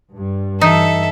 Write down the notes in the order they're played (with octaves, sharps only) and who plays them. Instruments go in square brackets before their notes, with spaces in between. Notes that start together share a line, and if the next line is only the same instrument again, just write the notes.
[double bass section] G2
[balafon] E3 [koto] D#4 [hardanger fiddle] A4 E5